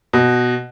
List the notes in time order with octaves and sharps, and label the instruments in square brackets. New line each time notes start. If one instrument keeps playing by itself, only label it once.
[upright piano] B2